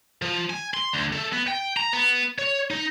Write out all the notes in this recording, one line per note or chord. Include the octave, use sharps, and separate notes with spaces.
F3
G#5
C6
D2
A3
B3
G5
A#5
B3
C#5
D#4